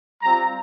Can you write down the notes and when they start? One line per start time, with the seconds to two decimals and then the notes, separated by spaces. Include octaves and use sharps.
0.22 G3 C4 F4 A#5